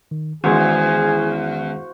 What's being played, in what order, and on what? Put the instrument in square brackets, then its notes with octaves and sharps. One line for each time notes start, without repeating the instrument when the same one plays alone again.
[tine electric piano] D#3
[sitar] E2 [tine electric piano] D#3 G#3 C#4 [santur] F#4 C5 F5 [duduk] G#4